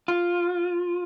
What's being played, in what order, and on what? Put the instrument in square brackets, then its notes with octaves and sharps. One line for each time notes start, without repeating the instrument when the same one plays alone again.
[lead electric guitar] F4